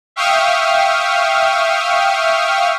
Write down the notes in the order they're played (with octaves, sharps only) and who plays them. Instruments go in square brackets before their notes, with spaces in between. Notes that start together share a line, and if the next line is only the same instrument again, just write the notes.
[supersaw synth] E5 F5 G5 C#6 D#6 F6